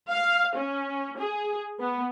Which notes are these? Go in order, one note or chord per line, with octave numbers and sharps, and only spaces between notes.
F5
C#4
G#4
B3